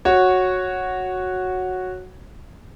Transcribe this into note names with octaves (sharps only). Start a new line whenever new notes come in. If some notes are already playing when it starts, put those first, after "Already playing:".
F#4 C#5